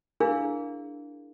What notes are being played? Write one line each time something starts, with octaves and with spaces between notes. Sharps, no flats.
D4 E4 G#4 A#4 F5